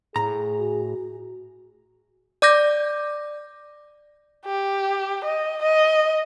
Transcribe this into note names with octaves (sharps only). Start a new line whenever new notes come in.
A2 G#4 A#5
F#4
D5 D6 G6 A#6
G4
D#5
D#5